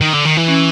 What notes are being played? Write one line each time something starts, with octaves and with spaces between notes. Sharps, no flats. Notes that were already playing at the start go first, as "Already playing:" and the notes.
D#3
D3
D#3
E3
C#4